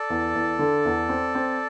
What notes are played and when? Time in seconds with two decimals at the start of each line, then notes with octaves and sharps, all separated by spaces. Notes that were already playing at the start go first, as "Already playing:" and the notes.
Already playing: A4 D5
0.10 E2
0.35 E2
0.59 D3
0.85 E2
1.09 C4
1.35 C4